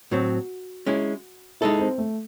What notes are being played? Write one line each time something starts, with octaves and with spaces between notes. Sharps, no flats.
A2 F#3 C4 F#4
G#3 C#4 E4
G#3 D#4 E4 A4
C4
A3